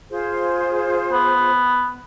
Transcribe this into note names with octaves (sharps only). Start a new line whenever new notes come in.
F4 G#4 C5
B3